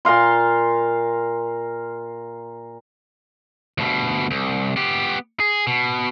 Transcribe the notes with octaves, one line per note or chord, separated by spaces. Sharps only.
A#2 A#4 F5 C6
D2 B2
C2
B3 G4
G#4
B2